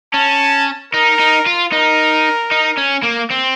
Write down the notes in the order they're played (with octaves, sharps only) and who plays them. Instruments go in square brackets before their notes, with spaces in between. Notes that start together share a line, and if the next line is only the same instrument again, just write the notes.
[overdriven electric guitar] C#4 [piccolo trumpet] A5
[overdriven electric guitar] D#4 [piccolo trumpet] A#4
[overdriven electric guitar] D#4
F4
[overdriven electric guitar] D#4 [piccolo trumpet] A#4
[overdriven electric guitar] D#4
C#4
A#3
C4